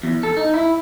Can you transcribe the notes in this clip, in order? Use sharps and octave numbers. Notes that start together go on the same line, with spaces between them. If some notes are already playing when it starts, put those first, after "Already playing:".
E2
A4
D#4
E4